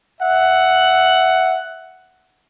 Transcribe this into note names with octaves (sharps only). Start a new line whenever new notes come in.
E5 F#5